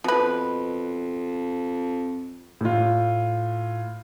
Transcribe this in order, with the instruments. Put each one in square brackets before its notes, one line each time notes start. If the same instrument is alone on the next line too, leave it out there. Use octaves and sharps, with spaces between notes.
[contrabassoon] F2 [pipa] B2 B4
[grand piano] A2 F4